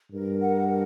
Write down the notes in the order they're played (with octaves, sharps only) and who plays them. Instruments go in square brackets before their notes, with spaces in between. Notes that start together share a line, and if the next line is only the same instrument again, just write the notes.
[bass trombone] G2 [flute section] A#4
[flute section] F#5
A#4